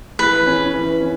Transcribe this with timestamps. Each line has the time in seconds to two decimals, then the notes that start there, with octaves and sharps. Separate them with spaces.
0.19 E3 B4
0.46 C#4
0.74 E3
1.00 C#4